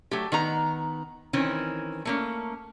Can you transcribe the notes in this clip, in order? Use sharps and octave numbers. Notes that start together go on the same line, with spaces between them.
F#3 A3 G4
D#3 B3 A#5
D#3 E3 C4 C#4
A3 A#3 C#4